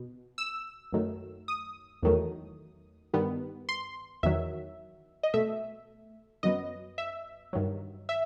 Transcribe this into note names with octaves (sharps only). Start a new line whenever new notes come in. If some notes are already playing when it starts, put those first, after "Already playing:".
Already playing: B2
E6
F#2 D#3 F#3 A3
D#6
E2 D#3 F#3 A3
G2 D#3 G3 B3
C6
E2 D#3 F#3 E5
D#5
B2 A3 E5
F#2 F#3 B3 D#5
E5
G2 D#3 F#3
E5